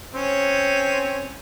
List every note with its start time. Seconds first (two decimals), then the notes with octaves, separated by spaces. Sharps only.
0.14 C4 C#4